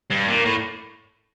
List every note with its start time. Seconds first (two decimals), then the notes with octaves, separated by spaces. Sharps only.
0.10 G2
0.28 A#2
0.45 A2